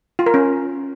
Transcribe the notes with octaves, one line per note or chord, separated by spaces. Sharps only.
F4
A#4
C#4